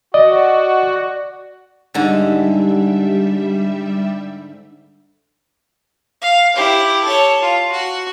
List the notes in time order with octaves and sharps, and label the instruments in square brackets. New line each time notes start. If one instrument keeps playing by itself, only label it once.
[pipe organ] F#4 [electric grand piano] D5 [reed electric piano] D#5
[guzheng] G#2 D3 [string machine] G3 E5
[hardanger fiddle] F5
E4 G4
A4 C#5
F4
F#4